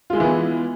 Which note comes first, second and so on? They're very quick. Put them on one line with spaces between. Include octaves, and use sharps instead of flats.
F4 G#3 E4 E3 B3